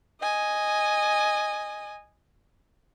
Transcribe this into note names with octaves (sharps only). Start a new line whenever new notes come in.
D#5 G#5